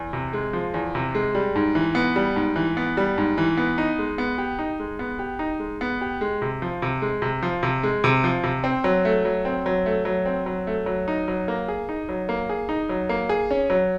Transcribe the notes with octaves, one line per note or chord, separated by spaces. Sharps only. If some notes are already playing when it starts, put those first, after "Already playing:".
Already playing: E2
C3
G#3
F3
E2
C3
G#3
G3
G#2
E3
B3
G3
G#2
E3
B3
G3
G#2
E3
B3
D#4
G#3
B3
G4
D#4
G#3
B3
G4
D#4
G#3
B3
G4
G#3
C3
F3
C3
G#3
C3
F3
C3
G#3
C3
F3
C3
C4
F#3
A3
F#3
C4
F#3
A3
F#3
C4
F#3
A3
F#3
D#4
F#3
A#3
G#4
D#4
F#3
A#3
G#4
D#4
F#3
A#3
G#4
C#4
F#3